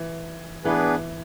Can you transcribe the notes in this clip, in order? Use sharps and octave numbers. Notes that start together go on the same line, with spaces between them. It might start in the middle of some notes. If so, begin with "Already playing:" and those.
Already playing: E3
E3 B3 D4 G#4 B4